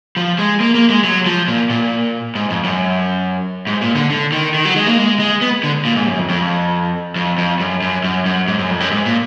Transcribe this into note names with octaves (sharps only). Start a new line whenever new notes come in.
F3
G#3
A#3
A#3
G#3
F#3
F3
A#2
A#2
G#2
F2
F#2
G#2
A#2
D3
D3
D#3
D#3
F#3
G#3
A#3
G#3
G#3
B3
D3
A#2
G#2
F#2
F2
F2
F2
F2
F#2
F#2
F#2
F#2
G#2
F#2
F2
F#2
G#2
A#2